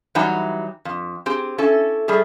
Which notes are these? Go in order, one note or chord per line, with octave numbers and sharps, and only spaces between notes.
E3 F#3 G3 D#4 F#5 G#5
F2
C4 G4 G#4
C#4 E4 A4
G3 A3 G#4